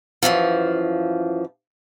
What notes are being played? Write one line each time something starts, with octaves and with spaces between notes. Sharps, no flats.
F#2 B2 E3 F3